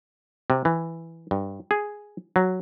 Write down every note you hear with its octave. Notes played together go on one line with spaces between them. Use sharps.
C3
E3
G2
G#4
F#3